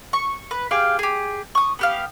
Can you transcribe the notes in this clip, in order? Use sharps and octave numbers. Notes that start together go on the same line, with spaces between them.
C#6
B4
G4 G#4 F5 G5
G4 G#4
C#6 D#6
B3 G4 F5